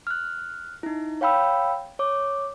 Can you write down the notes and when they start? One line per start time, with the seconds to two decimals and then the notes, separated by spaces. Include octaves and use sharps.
0.07 F6 F#6
0.83 D#4 E4
1.21 C#5 F5 G5 B5 E6
1.99 C#5 D6